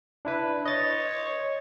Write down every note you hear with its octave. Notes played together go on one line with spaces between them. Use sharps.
D4 E4 B4
C#5 D#5 A6